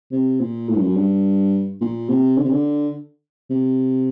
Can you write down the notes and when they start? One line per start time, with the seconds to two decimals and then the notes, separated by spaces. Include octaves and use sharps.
0.12 C3
0.40 A#2
0.68 A2
0.75 G2
0.82 F#2
0.96 G2
1.81 A#2
2.09 C3
2.37 D3
2.44 C3
2.52 D3
3.50 C3